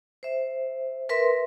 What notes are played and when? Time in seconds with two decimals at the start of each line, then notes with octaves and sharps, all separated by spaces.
0.23 C5 E5
1.09 A#4 B4 E5 C6